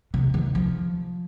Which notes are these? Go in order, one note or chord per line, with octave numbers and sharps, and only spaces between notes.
C3
D#3
F3